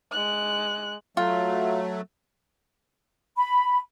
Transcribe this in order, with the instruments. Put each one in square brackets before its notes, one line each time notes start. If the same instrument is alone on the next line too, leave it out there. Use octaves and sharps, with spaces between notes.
[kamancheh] G#3 F#6
[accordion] F#3 A3 [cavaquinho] F4
[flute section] B5